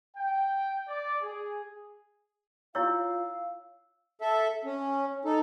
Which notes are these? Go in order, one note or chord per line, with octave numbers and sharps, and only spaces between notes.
G5
D5
G#4
E4 F4 C#5 F5 C#6 E6
A4 E5
C#4
D#4 A4